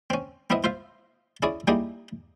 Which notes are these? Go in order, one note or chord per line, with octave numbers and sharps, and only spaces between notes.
C4 C#4
B3 C4 E4 D#5 E5
F4 C5 E5 F5
C#4 E4 G#4 D5
G3 A#3 D#4 E4 G4 G#4